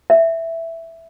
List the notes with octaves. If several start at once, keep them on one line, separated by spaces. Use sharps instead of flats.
E5